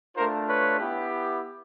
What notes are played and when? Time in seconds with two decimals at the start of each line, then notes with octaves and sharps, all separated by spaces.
0.16 A3 D4 F4 A#4 C5
0.48 B4 C#5
0.79 B3 E4 G4